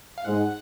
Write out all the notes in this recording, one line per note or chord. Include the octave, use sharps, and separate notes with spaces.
F5
G#2 G#3 F#5